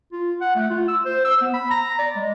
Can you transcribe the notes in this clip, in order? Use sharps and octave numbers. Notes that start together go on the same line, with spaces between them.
F4
F#5
A3
F4
E6
C5
E6
B3
B5
A#5
D5
G#3